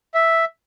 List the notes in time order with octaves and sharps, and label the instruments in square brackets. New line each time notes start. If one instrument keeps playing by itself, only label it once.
[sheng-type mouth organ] E5